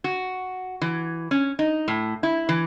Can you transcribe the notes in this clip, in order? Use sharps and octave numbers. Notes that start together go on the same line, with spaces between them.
F#4
E3
C#4
D#4
A2
E4
E3